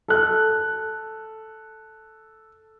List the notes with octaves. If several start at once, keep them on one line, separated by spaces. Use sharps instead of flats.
A4 F#6